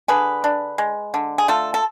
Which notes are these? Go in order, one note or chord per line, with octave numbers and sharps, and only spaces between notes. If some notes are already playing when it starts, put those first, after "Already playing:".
D3 G#4 B4
D4
G#3
D3
G#4
A3 F4 A4
A4